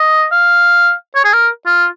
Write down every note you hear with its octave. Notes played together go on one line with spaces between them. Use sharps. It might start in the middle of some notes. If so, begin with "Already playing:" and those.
Already playing: D#5
F5
C#5
G#4
A#4
F4